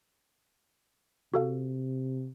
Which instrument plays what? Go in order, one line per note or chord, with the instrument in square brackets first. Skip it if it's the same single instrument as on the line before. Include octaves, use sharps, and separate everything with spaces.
[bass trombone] C3 [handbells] F#4 A4 F5